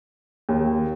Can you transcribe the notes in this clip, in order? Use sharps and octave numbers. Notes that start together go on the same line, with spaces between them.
D#2